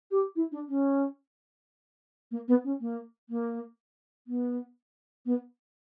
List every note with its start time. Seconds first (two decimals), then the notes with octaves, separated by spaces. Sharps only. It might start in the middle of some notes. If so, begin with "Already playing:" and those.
0.11 G4
0.36 E4
0.52 D4
0.68 C#4
2.31 A#3
2.48 B3
2.64 C#4
2.81 A#3
3.30 A#3
4.27 B3
5.26 B3